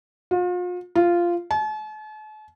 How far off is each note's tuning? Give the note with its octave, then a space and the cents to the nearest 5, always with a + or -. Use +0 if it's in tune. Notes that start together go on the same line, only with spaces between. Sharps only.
F4 +40
F4 -10
A5 -45